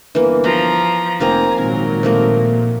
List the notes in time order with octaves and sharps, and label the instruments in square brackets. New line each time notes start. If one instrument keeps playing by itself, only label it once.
[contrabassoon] G1 [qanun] E3 A#3
[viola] F3 A#5 [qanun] B5
[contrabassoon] F1 [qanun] F3 A#3 C4 [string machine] G#5 [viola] A#5
[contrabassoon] G#1 [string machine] A#2 [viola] F#3 A#4
[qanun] F3 A3 A#3